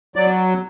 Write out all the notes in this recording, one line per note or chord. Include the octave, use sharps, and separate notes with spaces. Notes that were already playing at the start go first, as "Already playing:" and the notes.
F#3 D5